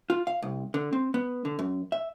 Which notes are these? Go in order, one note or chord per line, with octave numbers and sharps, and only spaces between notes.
F4
F5
C2
D3
C4
B3
D3
F#2
E5